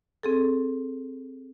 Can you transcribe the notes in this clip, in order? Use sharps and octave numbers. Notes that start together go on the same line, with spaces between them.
C4 G#4 A4